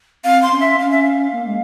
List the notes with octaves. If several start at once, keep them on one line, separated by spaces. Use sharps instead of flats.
C4 F5
C6
C#4
E5
C#4 F5
E5
F5
A#3
G#3